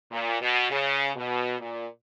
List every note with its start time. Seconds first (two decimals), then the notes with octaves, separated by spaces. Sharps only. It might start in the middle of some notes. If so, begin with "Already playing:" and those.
0.12 A#2
0.41 B2
0.71 C#3
1.15 B2
1.59 A#2